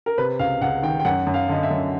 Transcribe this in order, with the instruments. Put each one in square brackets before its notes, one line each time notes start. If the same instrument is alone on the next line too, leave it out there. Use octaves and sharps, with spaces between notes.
[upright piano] A#4
C3 B4
C#2 F5
C#2 F#5
D#3 G5
G5
F#2 F#5
F#2
F5
D3 D#5
E5
F#2